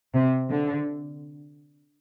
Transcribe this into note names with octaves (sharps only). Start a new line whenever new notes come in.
C3
D3